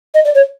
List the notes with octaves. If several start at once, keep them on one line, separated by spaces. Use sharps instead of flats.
D#5
D5
C#5